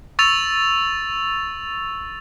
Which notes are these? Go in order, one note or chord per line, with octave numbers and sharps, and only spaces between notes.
C#6 E6 A6 F7